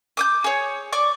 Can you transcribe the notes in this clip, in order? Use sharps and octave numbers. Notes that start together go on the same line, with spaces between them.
D6 D#6 G6
G#4 C#5
D5 C#6 D6